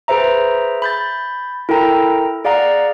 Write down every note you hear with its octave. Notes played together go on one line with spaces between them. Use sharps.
G#4 B4 C5 E5 A#5
B5 G6 A6
E4 A4 A#4 G5 A#5
G#4 D5 F5 F#5 A#5